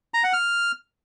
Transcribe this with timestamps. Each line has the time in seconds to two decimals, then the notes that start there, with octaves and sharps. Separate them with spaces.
0.14 A#5
0.24 F#5
0.33 F6